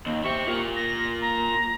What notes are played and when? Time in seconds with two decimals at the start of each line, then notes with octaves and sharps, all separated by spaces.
0.06 D#2 D#5
0.24 G4 C5 E5 C#6
0.47 F4 A#4
0.76 A#3 A#6
1.22 A#5